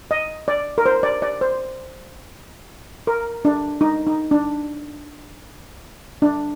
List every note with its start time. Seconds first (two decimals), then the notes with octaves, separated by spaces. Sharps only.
0.11 D#5
0.48 D5
0.78 A#4
0.86 C5
1.03 D5
1.22 D5
1.41 C5
3.07 A#4
3.45 D4
3.81 D#4
4.07 D#4
4.31 D4
6.22 D4